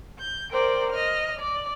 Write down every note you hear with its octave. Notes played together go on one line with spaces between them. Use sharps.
G6
A#4 C5 D5 G5
D#5 F6
D5